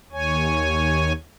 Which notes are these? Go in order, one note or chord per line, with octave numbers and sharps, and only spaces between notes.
D#2 C#5 G#5